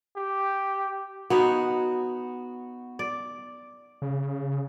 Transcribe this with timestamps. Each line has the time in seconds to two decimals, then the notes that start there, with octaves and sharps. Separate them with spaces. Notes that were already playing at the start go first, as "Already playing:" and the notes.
0.17 G4
1.30 B3 D#4 F#4 C#5
2.99 D5
4.02 C#3